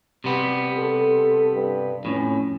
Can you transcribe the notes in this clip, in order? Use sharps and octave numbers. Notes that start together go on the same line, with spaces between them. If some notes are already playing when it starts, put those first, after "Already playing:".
C3 G3 B3
A4
G2
F2 A2 C#4